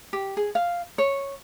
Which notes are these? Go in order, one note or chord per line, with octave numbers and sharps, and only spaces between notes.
G4
G#4
F5
C#5